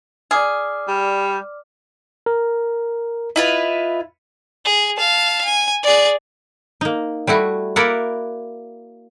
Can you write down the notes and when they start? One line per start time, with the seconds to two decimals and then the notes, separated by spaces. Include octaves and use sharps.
0.31 G#4 D5 D6 F6
0.88 G3
2.26 A#4
3.36 E4 F4 B4 D#5
4.65 G#4
4.97 F5 A5
5.44 G#5
5.83 G#4 D5
6.81 A#3 D#4
7.27 G3 A3 E4 F#4
7.76 A#3 E4 A#4 D5 E5 F#5